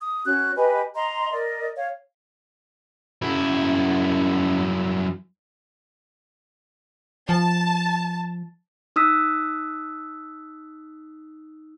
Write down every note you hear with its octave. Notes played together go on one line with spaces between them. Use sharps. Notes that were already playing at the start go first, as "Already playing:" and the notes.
D#6
C#4 F#4 F#6
G4 B4 D#5 G#5
D#5 A#5 C6
A#4 D5 D#5
C#5 F5
F#2 E4
F3 A5
D#4 D#6 E6 F#6 B6